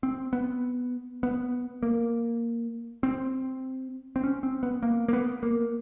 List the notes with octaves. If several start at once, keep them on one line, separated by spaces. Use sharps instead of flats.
C4
B3
B3
A#3
C4
C4
C#4
C4
B3
A#3
A#3
B3
A#3